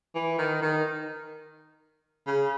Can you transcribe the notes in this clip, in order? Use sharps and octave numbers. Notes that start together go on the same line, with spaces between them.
E3
D#3
D#3
C#3